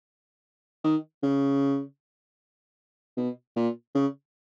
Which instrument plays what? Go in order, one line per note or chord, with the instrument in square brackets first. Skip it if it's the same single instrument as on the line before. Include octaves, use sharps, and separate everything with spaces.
[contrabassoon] D#3
C#3
B2
A#2
C#3